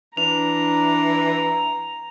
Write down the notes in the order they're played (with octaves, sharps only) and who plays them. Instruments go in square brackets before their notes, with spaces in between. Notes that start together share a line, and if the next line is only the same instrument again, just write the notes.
[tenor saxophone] E3 [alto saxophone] D4 [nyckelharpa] A#5 [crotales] F7